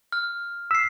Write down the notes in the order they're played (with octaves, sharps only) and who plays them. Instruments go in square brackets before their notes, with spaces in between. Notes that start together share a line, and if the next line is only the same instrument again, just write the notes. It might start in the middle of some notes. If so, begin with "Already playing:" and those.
[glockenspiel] F6
[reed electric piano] E6 [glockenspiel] B6 C7